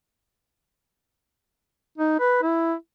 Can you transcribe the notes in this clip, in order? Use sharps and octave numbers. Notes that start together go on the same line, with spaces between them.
D#4
B4
E4